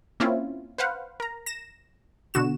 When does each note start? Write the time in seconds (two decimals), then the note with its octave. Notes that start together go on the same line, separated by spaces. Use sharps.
0.20 A#3 C4 C#4 E4 F4
0.78 B4 C5 F5 F#5
1.20 A#4 A#5
1.46 A#6 E7
2.34 B2 D3 F#4 E7